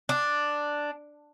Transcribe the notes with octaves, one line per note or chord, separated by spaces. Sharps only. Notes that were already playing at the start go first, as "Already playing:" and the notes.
D4